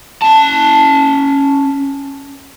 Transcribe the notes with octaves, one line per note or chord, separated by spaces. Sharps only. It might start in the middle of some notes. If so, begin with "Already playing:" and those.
C#4 A5